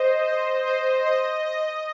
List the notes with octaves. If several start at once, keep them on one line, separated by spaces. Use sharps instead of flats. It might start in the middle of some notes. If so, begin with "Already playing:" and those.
Already playing: C5 D#5
D#5
C5
D#5
D#5